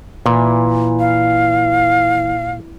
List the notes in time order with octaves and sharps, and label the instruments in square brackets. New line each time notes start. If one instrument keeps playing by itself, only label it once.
[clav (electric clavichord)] A#2 [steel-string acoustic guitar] E3
[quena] F5